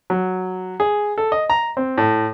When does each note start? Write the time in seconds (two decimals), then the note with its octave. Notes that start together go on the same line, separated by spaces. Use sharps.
0.10 F#3
0.80 G#4
1.18 A4
1.32 D#5
1.50 A#5
1.77 C4
1.98 A2